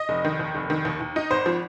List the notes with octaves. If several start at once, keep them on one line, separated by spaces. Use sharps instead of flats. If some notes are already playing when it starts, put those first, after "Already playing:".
Already playing: D#5
F1
D#3
D#2
F1
D#3
D#2
D#2
D#4
G#1 C5
F3